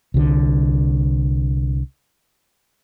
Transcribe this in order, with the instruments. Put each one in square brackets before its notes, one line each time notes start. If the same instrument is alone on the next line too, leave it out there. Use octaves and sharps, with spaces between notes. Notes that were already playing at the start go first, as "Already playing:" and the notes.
[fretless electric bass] C2 D3